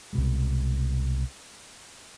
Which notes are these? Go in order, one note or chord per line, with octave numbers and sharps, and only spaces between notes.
C2 B2 G#3